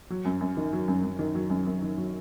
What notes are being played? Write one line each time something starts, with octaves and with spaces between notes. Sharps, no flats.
F#3
F#2
F#2
D#3
F#3
F#2
F#2
D#3
F#3
F#2
F#2
D#3
F#3